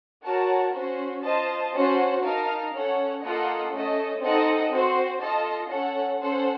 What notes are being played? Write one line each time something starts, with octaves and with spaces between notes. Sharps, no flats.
F#4 A#4 C#5 F#5 A5
C#4 F#4 C5
F4 C5 D#5 A5
C#4 F#4 C5 F#5 A5
D#4 A#4 F5 A5
C#4 A4 C#5 F#5
A#3 F4 A4 D#5 F#5
A3 C#4 A4 D#5
C4 D#4 A4 D#5 F#5
C4 F#4 C5
F4 A4 D#5 A5
C#4 A4 C#5 F#5
C#4 A4 C5 F#5